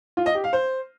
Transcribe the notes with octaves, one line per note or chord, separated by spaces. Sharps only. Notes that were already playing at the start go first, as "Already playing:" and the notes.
F4
D#5
G4
F5
C5